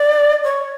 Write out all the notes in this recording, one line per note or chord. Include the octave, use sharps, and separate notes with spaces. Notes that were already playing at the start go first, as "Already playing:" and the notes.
Already playing: D5
C#5